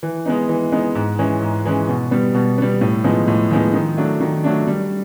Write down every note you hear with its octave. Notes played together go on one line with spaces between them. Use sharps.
E3
G#3 B3 D#4
E3
G#3 B3 D#4
G#2
E3 G#3 C#4
G#2
E3 G#3 C#4
B2
G3 B3
B2
G3 B3
A2
F3 G#3 B3 D#4
A2
F3 G#3 B3 D#4
D#3
F#3 A3 D4
D#3
F#3 A3 D4
G3